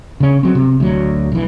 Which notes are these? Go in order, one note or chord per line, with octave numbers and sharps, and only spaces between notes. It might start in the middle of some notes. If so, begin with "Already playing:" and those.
C#3 C#4
F#3 C4
C3
D2 F#3
B1 E3